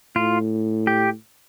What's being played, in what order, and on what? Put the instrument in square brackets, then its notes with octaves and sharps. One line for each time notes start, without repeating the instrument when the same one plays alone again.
[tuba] A2 [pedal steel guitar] F4
[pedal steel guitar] G4